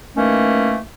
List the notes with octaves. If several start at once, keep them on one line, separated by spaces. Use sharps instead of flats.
D#3 E3 A3 A#3 C#4